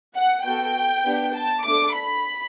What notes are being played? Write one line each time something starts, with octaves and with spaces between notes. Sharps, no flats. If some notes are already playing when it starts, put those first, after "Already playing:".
F#5
B3 F#4 A4 G5
B3 D4 G4
A5
A3 D4 A4 D6
B5